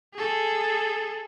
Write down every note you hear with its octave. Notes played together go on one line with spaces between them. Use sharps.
G#4 A4